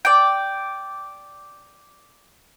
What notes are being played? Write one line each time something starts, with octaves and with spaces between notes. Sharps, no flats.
D5 G5